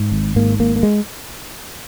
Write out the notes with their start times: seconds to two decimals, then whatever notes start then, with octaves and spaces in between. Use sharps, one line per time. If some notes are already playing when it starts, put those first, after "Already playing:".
Already playing: G#2
0.12 G#1
0.36 G#2 A#3
0.60 G#1 A#3
0.76 A#3
0.83 G#3